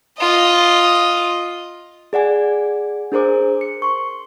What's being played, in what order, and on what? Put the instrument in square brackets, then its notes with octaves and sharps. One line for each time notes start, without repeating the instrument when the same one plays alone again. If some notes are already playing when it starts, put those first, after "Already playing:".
[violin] F4 D#5
[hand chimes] G#4 D5 F#5 G#5
D4 G#4 A#4 C5 D6
C#7
C6 C#6